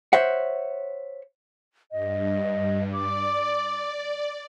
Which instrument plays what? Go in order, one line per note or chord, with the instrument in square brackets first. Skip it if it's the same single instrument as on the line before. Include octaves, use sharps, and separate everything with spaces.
[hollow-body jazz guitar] C5 C#5 E5 F#5
[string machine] G2 [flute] D#5
[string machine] D5 [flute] D6